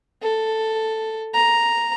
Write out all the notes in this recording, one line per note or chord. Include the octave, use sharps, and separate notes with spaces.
A4
A#5